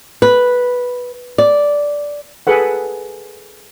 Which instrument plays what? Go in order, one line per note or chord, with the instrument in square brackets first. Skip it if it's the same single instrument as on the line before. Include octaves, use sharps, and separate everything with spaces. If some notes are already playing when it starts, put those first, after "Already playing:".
[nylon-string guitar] B4
D5
[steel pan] G#4 A4 B4 F#5